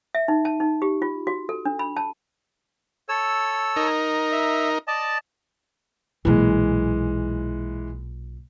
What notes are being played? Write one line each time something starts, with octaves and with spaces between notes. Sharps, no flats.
E5
D#4
A5
D#4
G4
F4
F#4
A4
D4
B5
A5
A4 C#5 E6
D#4 A#4
E5
D5 D#5 A5
B1 A#2 E3 G#3